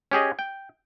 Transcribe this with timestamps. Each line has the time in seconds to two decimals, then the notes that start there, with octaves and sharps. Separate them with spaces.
0.12 C#4 G4 G#4 D#5
0.39 G5